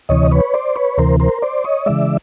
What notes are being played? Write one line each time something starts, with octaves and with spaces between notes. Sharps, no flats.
D2 C3 E3 C#5 D#5
B4 C#5
C5 D5
B4 C#5
D2 C3 E3 A#4 C5
A#4 C5
C5 D5
C#5 D#5
C#3 E3 G#3 D5 E5